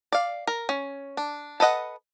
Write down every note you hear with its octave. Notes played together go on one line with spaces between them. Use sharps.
D5 F5
A#4
C#4
D4
A4 B4 D#5 F#5